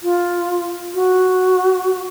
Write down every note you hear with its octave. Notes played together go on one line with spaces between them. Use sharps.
F4
F#4